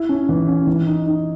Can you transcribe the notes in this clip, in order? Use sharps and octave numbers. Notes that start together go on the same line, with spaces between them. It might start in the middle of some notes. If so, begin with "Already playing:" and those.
Already playing: E4
C#4
E3
C#4
E3
D#4
D#4